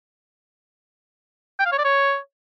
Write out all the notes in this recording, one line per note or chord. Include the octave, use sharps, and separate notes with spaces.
G5
F5
C#5
D5
C#5